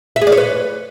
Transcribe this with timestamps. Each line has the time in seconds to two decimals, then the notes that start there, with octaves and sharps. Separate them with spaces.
0.16 E5
0.21 G#4
0.27 D5
0.32 C#5
0.38 B4